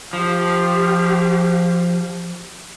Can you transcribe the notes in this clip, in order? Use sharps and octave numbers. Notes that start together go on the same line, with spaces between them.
F3 G4 F5